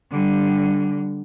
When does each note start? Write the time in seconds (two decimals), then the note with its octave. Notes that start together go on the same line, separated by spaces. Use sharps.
0.11 D3 G3